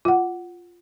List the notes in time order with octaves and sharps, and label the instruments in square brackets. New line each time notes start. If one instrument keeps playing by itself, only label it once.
[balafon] F4 F#5